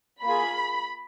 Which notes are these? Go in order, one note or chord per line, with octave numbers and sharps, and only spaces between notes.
A#3 F4 G#4 B5